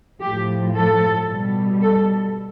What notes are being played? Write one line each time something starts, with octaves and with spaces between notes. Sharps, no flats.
A2 F3 G4
A4
B2 G3
A4